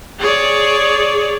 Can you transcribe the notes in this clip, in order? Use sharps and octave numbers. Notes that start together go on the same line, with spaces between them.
G#4 C#5 D5